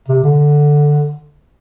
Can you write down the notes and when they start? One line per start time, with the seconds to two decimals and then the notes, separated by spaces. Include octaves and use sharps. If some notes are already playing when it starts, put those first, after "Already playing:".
0.08 C3
0.24 D3